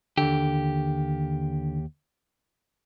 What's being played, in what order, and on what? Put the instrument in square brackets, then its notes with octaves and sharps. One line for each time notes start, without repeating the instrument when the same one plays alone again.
[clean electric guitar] D#2 G4 [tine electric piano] D3